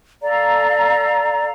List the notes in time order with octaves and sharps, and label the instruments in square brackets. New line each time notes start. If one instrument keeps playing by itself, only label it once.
[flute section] A4 F5 A#5 [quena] D5